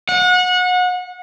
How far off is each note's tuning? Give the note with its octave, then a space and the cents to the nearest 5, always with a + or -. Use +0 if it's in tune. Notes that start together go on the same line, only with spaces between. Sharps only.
F#5 -30